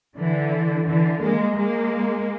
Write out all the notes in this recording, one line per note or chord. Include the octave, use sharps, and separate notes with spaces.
D3 E3
D3 E3
G#3 A#3
G#3 A#3